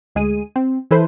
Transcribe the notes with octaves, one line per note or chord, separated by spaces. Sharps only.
D2 G#3 G#4 D#7
C4
E3 E4 A4 B4 C5